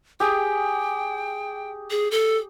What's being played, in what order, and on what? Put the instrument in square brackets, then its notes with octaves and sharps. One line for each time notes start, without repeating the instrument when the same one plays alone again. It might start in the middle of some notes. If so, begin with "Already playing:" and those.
[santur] G4 G#4 [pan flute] G5
[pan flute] G#4
A4